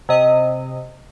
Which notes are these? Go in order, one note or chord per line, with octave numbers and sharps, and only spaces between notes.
C3 D#5